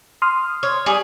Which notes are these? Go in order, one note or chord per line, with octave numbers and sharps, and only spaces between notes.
C6 D#6 F6
C#5
G3 G#4